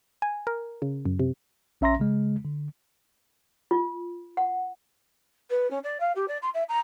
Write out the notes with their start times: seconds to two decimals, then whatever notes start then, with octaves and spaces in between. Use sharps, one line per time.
0.22 G#5
0.47 A#4
0.82 C#3
1.05 F#2
1.19 C3
1.81 A#1 C#4 E5 A#5 C6 A#6
2.00 C#3 G#3
2.45 D3
3.71 F4
4.37 F#5
5.50 B4
5.70 C#4
5.83 D5
6.00 F5
6.15 G4
6.28 D5
6.42 C6
6.54 E5
6.68 A#5